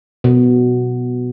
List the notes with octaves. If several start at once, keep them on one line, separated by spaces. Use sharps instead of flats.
B2